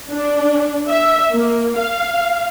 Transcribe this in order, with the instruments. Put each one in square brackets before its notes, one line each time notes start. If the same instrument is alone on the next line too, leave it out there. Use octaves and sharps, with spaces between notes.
[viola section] D4
E5
A#3
F5